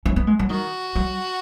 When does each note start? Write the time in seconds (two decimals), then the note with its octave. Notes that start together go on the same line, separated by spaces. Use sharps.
0.06 C#4
0.16 B3
0.27 G#3
0.39 F#3
0.50 D#3 F#4
0.95 F#3